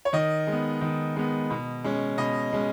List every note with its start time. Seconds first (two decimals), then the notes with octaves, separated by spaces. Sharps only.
0.05 C#5
0.13 D#3 D#5
0.47 G#3
0.52 B3
0.81 D#3
1.16 G#3 B3
1.50 B2
1.84 G#3 C#4
2.18 B2 D#5
2.53 G#3 C#4